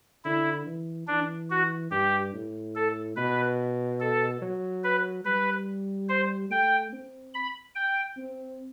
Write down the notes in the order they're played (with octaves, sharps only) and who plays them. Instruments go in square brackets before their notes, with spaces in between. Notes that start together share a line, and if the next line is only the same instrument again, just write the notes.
[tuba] D3 [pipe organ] E4
[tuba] E3
[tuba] E3 [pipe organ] D4
[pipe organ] F#4
[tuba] G2 [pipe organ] G4
[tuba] A2
[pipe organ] A4
[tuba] B2 [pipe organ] B4
[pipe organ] A4
[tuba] F#3
[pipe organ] B4
[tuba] G3 [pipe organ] B4
[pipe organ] C5
[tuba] A3 [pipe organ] G5
[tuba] C4
[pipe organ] B5
G5
[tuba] C4